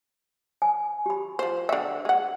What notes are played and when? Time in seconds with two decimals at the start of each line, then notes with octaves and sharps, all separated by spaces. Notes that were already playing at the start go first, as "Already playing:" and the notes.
0.62 G#5
1.06 G4 B5
1.39 F3 C5
1.69 D3 E5 G5
2.05 G#3 F#5